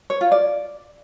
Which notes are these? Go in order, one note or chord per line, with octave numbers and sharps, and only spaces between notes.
C#5
F4
D5